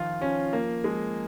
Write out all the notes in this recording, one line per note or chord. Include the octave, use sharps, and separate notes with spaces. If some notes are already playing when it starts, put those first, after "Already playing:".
Already playing: D#3 F3 F4
F3 C#4
F3 A#3
F3 G#3